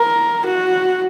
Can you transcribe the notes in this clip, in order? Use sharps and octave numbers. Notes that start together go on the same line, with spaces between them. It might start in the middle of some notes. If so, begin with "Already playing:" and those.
Already playing: A#4
F#4